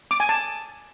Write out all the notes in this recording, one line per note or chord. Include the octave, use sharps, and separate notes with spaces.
D6
G#5
A5